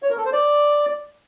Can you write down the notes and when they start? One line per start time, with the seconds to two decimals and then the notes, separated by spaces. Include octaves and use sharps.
0.03 C#5
0.10 A#4
0.18 A4
0.25 C5
0.33 D5